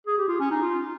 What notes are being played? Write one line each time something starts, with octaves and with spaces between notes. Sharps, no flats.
G#4
G4
F4
C#4
D#4
F4